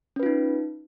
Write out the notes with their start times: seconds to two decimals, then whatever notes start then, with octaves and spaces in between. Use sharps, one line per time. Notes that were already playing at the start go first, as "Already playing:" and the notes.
0.16 C#4
0.20 B4
0.23 F4
0.26 D#4